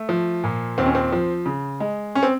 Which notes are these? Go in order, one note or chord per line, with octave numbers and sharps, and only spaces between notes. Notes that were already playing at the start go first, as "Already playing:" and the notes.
Already playing: A3
F3
A#2
D#2 C4
C#4
C4
F3
C#3
G#3
C#4
C4